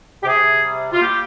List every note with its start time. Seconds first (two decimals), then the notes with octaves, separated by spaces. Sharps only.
0.21 G4
0.25 C3 G#4
0.63 G3
0.91 F4
1.01 A#3 G4